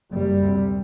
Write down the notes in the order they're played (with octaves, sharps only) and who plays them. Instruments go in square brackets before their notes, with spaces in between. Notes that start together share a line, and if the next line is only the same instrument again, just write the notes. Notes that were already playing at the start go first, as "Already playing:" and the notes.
[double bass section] F#1 F#2 G3
D2 C3